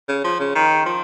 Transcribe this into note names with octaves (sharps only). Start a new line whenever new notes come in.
C#3
F3
C#3
D#3
F3